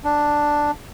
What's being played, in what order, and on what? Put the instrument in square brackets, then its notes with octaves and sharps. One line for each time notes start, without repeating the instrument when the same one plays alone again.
[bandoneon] D4